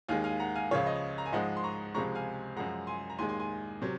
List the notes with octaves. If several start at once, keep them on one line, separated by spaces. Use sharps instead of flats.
D#2 D#3 G#3 F5 G#5
F5 G#5
F#5 A#5
F5 G#5
C#2 C#3 F3 C#5 F5
D#5
A#5
G#5
G#2 F3 G#3 D#5 F#5
C6
A#5 C#6
C#2 C3 F3 G#3 A#5 C#6
F5 G#5
F#2 F3 G#3 F#5 A#5
G#5 C6
A#5
D#2 D#3 G#3 G#5 C6
G#5 C6
G#5 C6
C3 F#3